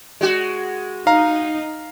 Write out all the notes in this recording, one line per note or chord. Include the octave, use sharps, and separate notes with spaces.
G#3 F#4
D#4 F5 A#5